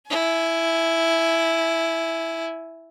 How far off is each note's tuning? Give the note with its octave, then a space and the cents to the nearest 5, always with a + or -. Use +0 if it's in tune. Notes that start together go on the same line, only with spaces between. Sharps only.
E4 +0 G#5 +25